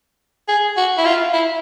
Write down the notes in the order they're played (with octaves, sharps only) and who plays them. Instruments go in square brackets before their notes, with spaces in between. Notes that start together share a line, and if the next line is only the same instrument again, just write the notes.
[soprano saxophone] G#4
F#4
E4
F4
E4